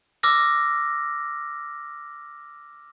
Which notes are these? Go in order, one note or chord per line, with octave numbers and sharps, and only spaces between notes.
D6 E6 F6 A#6